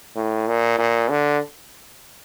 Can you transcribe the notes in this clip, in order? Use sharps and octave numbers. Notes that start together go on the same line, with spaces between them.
A2
A#2
A#2
D3